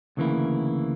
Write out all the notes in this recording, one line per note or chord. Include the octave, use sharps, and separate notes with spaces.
D2 C#3 E3 A#3 E4